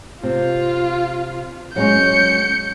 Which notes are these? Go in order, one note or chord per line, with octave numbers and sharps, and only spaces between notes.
C3 F4
F#3 G#3 C#4 G6 C#7